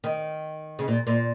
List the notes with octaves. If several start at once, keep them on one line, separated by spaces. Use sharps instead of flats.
D#3
C#3
A#2
A#2